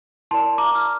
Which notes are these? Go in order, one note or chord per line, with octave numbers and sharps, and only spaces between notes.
E4 A#4 D5 A5 C6
A#5 D6
F6